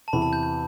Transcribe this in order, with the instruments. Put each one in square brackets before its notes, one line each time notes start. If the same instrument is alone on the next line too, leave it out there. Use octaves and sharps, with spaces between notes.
[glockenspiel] A5
[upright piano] E2 C3 E3 [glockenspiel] B5
[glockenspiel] A5
G6
G6